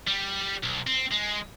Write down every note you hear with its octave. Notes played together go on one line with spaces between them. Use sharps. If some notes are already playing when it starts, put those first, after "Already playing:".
G3
B1
C4
G#3